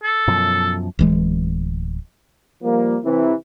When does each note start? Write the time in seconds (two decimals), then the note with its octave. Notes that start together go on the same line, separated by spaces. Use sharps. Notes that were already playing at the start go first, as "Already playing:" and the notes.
0.03 A4
0.27 F#2 B2 F3
0.99 D1 E3 G#3
2.62 F3 G3 A#3
3.03 C3 E3